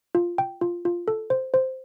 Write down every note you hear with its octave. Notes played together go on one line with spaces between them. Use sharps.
F4
G5
F4
F4
A4
C5
C5